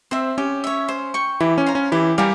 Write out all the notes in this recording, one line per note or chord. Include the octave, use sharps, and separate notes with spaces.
C4 C5 E5
C#4 G4
C#5 E5
C5
G5 C#6
E3 E4 G4
C#4
C5 F5 A#5
C#4
E3 E4 G4
G3 G4 A#4 F5 G#5